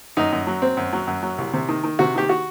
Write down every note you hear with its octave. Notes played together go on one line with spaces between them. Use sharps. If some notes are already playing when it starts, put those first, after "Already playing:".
F#2 D#4
F#2
F#3
C4
F#2
F#3
F#2
F#3
C2
C3
D#3
D#3
C3 F#4
D#3 G4
F#4